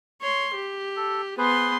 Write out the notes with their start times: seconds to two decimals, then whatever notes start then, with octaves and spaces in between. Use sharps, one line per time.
0.21 C#5 C6
0.54 G4
0.96 A4
1.38 B3 G#4 B4 C5 C6